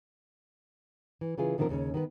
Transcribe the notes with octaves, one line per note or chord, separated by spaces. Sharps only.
E3
C#3 E3 F4 G#4
A2 D3 D#3 F3 C4 A#4
D#2 C#3 C#4
D#3 B3 B4